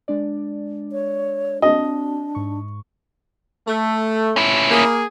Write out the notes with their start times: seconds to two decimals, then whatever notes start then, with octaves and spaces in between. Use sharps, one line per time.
0.08 G#3 D4 D5
0.92 C#5
1.62 C4 D4 F#4 D#5
2.35 G#2 C#6
3.68 A3
4.36 C#4 E4
4.71 A#3 G#4